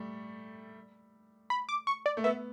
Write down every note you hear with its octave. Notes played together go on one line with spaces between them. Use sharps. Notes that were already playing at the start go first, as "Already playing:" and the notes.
Already playing: G3 A3
B5
D6
C#6
D5
A3
B3 E5